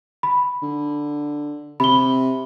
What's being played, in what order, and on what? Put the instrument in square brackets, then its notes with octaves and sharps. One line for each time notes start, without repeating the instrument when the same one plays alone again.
[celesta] B5
[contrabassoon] D3
[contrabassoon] C3 [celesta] B5 G7